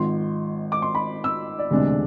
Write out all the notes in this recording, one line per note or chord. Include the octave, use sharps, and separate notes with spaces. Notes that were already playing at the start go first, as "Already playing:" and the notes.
Already playing: G#1 G#2 F3 C6
D6
C6
B5
E6
D5
E1 D2 C3 G#3 D4